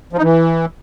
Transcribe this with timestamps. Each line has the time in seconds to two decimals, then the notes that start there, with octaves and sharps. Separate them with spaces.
0.13 F3
0.18 D#4
0.23 E3